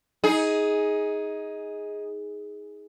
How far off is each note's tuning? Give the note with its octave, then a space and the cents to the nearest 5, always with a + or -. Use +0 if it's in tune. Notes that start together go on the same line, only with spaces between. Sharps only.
D#4 +20 G#4 +0